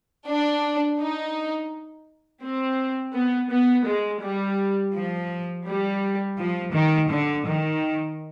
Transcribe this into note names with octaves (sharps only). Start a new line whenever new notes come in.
D4
D#4
C4
B3
B3
G#3
G3
F3
G3
F3
D#3
D3
D#3